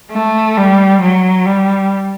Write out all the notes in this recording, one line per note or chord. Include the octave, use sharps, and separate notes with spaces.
A3
G3
F#3
G3